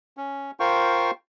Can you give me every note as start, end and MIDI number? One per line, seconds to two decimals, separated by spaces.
0.17 0.51 61
0.60 1.11 65
0.60 1.11 70
0.60 1.11 72
0.60 1.11 77
0.60 1.11 79
0.60 1.11 85